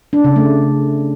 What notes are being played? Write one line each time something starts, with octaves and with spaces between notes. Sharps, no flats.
D4
C#3
A3